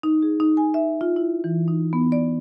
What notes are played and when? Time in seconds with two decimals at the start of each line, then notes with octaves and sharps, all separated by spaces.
0.03 D#4
0.22 G#4
0.40 D#4
0.57 G#5
0.74 E5
1.01 F4
1.16 E4
1.44 E3
1.68 D#4
1.93 B3
2.12 D5